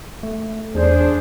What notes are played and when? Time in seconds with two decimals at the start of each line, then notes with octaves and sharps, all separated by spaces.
0.23 A3
0.75 E2 D4 G#4 C5